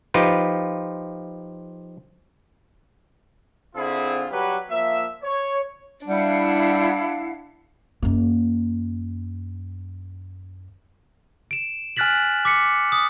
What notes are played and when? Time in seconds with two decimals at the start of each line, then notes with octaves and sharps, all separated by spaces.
0.14 F3 D#4 F4 G4 B4
3.76 D3 C4 E4 F4 G#4
4.31 F#3 G3 G4 B4
4.70 F3 A#3 E5
5.23 C#5
6.06 G3 D4 E4 F5 F#5
8.02 F#2 A#3
11.51 D7 E7
11.97 G#5 F6 F#6 A6 B6 F#7
12.45 D6 B6 C#7
12.92 D#6